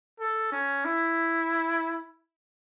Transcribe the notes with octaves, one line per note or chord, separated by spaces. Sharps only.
A4
C#4
E4